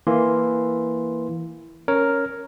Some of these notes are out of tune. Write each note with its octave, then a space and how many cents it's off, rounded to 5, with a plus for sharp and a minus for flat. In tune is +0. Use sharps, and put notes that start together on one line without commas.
E3 +0 A#3 +0 C6 +0
C#4 +0 A#4 +0 C#5 +0